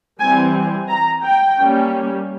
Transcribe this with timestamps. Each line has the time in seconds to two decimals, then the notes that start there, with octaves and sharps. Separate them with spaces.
0.20 E3 G3 C4 G#5
0.90 A#5
1.25 G5
1.60 G3 A#3 C#4